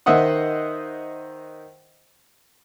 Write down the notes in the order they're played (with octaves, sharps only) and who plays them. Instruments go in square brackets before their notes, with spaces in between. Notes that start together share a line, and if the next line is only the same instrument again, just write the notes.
[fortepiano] D#3 C5 D#5 E5 F#5 D#6